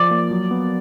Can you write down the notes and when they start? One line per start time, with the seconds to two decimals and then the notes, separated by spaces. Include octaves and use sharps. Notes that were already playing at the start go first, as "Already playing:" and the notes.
Already playing: F3 D5
0.11 A#3
0.31 F#3
0.51 B3